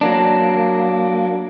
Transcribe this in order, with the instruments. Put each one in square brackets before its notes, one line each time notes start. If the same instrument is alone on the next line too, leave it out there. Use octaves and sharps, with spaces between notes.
[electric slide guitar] F#3 A#3 D4